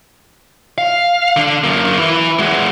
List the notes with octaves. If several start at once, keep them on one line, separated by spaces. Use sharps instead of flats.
F5
D3 D4
F#2 A#3
E4 B4
G#3 F#4